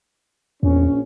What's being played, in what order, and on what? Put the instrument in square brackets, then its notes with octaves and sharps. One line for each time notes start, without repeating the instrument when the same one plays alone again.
[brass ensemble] A#1 C#4 [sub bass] E2